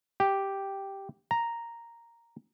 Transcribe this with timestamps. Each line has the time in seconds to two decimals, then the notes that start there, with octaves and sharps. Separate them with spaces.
0.20 G4
1.31 A#5